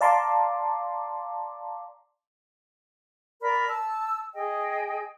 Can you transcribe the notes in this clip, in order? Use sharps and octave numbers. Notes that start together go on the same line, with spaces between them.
D5 F5 A5 A#5 C6 D6
A#4 D5 B5
A5 E6
G#4 D#5 G5